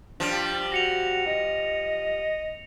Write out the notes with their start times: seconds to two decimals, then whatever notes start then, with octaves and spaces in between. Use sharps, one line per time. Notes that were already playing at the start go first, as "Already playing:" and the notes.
0.20 F3 G3 D4
0.72 F#4 A#6 C#7 F7
1.26 D#5